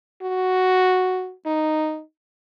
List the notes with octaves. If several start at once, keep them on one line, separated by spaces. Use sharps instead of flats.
F#4
D#4